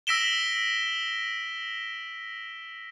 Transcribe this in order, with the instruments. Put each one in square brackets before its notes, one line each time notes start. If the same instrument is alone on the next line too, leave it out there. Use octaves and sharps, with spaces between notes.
[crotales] E6 A#6 B6 D7 E7 G7